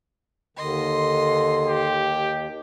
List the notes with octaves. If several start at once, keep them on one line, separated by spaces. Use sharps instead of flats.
D#2 D3 D#3 D#5 C6
G4